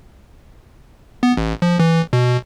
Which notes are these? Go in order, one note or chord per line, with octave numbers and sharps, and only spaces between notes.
B3
A1
F3
E3
B2